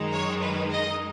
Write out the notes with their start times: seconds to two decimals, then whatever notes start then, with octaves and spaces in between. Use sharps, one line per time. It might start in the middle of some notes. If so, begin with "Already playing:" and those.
Already playing: F#2 D#3 G#3 D#4
0.12 C#5
0.42 B4
0.71 D#5